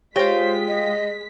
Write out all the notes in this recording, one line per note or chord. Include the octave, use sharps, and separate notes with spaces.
G#3 F4 G4 C5 C#5 G5 A#6 B6
D#5